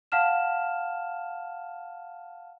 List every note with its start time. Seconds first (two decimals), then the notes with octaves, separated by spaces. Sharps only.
0.12 F5 F#5 A5 F6 E7